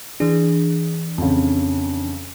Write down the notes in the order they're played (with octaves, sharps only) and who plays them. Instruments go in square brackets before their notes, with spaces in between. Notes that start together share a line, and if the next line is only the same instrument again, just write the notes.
[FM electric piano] E3 D4 [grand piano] G#4
[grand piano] F2 C#3